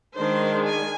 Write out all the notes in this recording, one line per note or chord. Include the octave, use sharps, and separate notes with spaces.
D#3 G#3 D4 C5
G#5